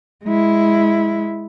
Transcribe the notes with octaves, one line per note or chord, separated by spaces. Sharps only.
G#3 E4